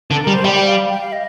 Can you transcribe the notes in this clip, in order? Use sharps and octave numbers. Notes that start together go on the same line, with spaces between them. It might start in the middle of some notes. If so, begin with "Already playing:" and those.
D3 A4
G3 A#4
C5
G3 G5
G5
F5
G5
F5
D#5